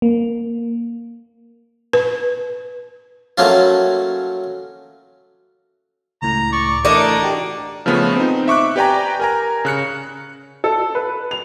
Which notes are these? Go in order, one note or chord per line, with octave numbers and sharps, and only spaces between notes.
A#3
B4
F#3 A3 A#3 C#4 F4
C#2 A2 A#5
D5 C#6
E3 A3 A#3 D4 D#4 A#4
F#4 G4
C#3 F3 A3 B3 C#4
C4 D#4
E5 C#6 D6 F#6
G4 B4 D5 G5 G#5 A#5
A#4 G#5 A#5
C#3 F#6 C#7
A4
B4
F7